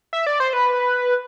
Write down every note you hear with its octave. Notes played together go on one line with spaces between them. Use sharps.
E5
D5
C5
B4